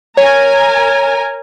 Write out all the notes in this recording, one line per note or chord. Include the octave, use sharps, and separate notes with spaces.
A#4 C#5 G#5 A#5